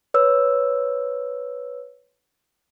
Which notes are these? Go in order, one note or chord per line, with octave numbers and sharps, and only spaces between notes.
B4 C#5 E6